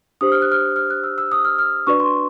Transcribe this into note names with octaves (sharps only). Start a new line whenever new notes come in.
D4 G4 C5 D#6
F6
F#6
F6
F6
F#6
E6
E6
D#6
F6
F6
D4 F#4 B4 D5 C#6
C6